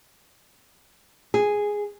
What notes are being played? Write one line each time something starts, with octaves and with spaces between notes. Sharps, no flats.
G#4